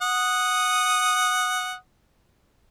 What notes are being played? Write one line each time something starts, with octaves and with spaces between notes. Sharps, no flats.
F#5 D#6